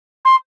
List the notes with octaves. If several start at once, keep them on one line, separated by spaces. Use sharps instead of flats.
C6